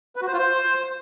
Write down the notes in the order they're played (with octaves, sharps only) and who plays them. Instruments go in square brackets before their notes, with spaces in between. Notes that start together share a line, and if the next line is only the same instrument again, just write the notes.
[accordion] B4
F#4
C5
F4
C5